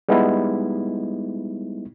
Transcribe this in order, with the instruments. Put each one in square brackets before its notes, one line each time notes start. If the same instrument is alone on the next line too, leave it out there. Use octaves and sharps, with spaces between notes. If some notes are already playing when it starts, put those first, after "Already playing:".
[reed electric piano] G3 G#3 B3 D#4 E4